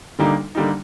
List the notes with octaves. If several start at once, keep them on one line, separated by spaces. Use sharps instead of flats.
D2 D3 G3 A#3 D#4
D3 G3 A#3 D#4